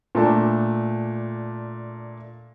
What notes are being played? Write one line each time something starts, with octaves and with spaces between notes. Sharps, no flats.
A#2 A3 D4 A5